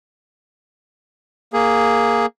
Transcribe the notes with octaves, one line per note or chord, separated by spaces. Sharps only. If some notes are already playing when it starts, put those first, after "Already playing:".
A#3 G#4